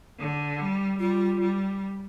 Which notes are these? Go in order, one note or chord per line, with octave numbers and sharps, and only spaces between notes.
D3
G3
G3 F4
G3